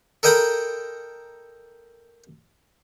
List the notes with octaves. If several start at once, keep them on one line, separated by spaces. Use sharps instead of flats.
A4 A#4 D#5 G5 A#5 B5